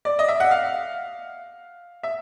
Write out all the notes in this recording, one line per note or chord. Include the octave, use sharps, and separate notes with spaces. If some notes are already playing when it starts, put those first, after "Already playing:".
D5
D#5
E5
F#5
F5
E5